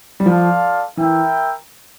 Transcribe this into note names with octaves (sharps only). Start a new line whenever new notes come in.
G3
F3 F4 A4 D5 F5
E3 E4 A#4 E5 G5